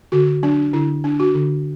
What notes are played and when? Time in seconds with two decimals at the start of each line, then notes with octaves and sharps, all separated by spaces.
0.12 D3 F#4
0.43 F#3 D4
0.73 D3 E4
1.04 D4
1.20 F#4
1.35 D3